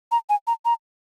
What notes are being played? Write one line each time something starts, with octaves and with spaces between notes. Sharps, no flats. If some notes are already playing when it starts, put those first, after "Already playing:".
A#5
G#5
A#5
A#5